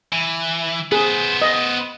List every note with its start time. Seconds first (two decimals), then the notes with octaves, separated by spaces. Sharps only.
0.13 E3
0.92 B3 G#4 C5
1.42 D#5